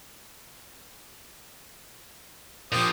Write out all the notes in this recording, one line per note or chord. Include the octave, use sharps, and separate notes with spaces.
A#2 F3 G4 C5 D#6